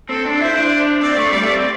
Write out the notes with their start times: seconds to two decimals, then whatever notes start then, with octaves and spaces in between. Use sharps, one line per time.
0.09 C4 A4
0.25 D4
0.41 E4 C5
0.56 D4
1.02 C4 D5
1.17 A3
1.31 G3 D5
1.42 A3
1.52 C4